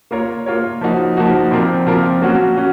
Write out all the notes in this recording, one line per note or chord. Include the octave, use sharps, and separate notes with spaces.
A#3 F4 A#4 C#5
A#3 F4 A#4 C#5
F3 A#3 D#4 F#4
F3 A#3 D#4 F#4
A#2 F3 C4 F4 A#4
A#2 F3 C4 F4 A#4
F#3 A#3 C#4 F#4
C#4 F#4